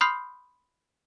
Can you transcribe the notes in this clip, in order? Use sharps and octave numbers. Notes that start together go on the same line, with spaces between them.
B5 C6 D#6 F6 G6 C7